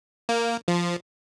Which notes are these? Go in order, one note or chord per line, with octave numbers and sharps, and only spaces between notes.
A#3
F3